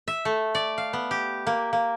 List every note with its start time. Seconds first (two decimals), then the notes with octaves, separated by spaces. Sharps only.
0.08 E5
0.25 A3
0.55 D5
0.78 F5
0.93 B3
1.11 G4
1.47 A#3
1.73 A#3